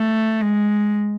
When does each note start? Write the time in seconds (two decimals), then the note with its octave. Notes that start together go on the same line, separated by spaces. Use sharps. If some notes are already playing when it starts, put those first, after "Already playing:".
Already playing: A3
0.41 G#3